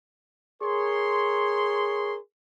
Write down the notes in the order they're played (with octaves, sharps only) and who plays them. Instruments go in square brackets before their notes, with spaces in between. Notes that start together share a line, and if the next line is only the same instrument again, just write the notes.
[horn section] G#4 A#4 C#5 C6